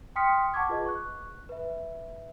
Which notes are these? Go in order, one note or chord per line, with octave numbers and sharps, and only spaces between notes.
G5 C6 D#6 F6 B6 C#7
F#5 A5 C#6 D6 G#6
F4 G#4 B4 D#5
C#6 F#6
B4 E5